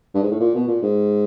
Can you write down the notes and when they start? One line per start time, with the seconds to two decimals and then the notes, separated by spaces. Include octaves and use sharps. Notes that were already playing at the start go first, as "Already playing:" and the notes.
0.15 G2
0.23 G#2
0.32 A2
0.40 A#2
0.55 B2
0.68 A#2
0.82 G#2